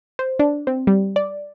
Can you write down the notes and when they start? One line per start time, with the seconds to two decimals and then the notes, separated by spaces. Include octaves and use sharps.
0.19 C5
0.39 D4
0.67 C4
0.87 G3
1.16 D5